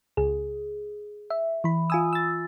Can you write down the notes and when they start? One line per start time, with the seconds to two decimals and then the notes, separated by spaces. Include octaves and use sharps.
0.17 C#2 G#4
1.30 E5
1.64 E3 B5
1.90 F4 G#5 D#6 E6
2.13 E6 A6